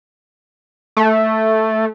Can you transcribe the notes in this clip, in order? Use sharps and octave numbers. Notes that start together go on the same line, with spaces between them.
A3